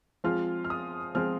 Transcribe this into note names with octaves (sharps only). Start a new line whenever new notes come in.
F3 G#3 C4 F4 F6
F6
D#6
F3 G#3 C4 F4 F6